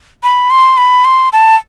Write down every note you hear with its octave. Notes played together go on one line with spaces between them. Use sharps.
B5
C6
B5
C6
A5